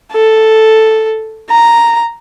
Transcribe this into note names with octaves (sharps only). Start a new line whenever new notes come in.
A4
A#5